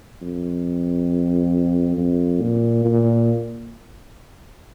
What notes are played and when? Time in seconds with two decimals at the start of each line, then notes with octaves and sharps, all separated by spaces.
0.22 F2
1.97 F2
2.41 A#2
2.85 A#2